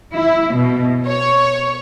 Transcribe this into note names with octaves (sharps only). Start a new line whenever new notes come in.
E4
B2
C#5